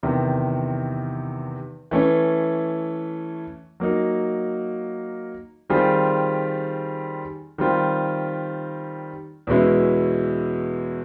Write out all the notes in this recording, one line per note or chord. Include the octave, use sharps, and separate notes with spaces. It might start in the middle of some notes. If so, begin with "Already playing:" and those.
E2 C3 D#3
E3 A3 C#4
F#3 A#3 D#4
D#3 G3 C4 F4 G#4
D#3 G3 C4 F4
E2 B2 G#3 C#4 E4